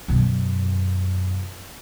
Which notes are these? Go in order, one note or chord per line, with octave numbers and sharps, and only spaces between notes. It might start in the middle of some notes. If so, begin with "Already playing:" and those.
F#2 B2